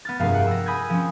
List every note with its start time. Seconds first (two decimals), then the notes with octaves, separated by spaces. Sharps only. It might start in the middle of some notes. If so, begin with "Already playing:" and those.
0.05 B3 F6 A6
0.19 F1 G2 A#3 G#4 F5
0.34 F#5 G5
0.47 E6 A#6
0.66 G#5 B5 D#6 G6 G#6
0.90 F3 C4 C#4